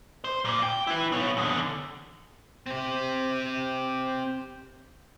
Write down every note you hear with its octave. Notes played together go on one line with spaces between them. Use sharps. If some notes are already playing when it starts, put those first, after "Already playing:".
C5
A#2 A#3
G5
E4 B4
B3 C#5
E2 D3
C4 G4